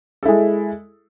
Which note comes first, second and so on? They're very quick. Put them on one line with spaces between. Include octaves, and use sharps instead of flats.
A4 E4 G#3